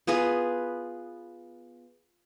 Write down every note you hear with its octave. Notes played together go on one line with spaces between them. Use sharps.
B3 F4 G#4 B4